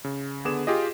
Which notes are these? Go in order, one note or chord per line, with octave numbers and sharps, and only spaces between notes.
C#3
D3 B3 G#4 D6 E7
F4 G4 G#4 D#5